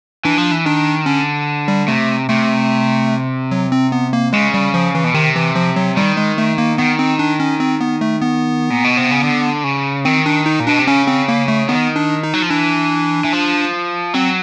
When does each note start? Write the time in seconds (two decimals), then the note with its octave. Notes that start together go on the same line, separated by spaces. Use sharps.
0.25 E3 D4
0.38 F3
0.51 E3
0.65 D#3 D4
1.06 D3 C#4
1.68 G3
1.88 C3 A3
2.29 C3 A3
3.52 F#3
3.72 C4
3.92 B3
4.13 A#3
4.33 C#3 G#3
4.54 G3
4.74 F3
4.95 E3
5.04 B2
5.14 C3 D#3
5.35 E3
5.56 F3
5.76 F#3
5.96 D#3 G3
6.17 G#3
6.38 A3
6.58 A#3
6.78 D#3 B3
6.99 C4
7.19 D4
7.40 C#4
7.60 C4
7.81 B3
8.01 A3
8.21 B3
8.70 A#2
8.84 B2
8.97 C3
9.11 C#3
9.24 D3
9.64 C#3
10.05 D#3 C4
10.26 D4
10.46 D#4
10.60 A#2
10.66 B2 D4
10.79 C3
10.87 C#3 C#4
11.07 C4
11.29 A#3
11.48 A3
11.68 D#3 B3
11.96 D4
12.23 D#4
12.33 F#3
12.42 F3
12.50 E3 D4
13.24 E3
13.33 F3
14.14 F#3 C4